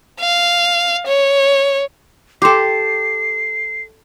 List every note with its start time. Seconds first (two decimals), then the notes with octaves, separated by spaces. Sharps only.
0.20 F5
1.07 C#5
2.42 G4 A4 G5 C6 D6 C7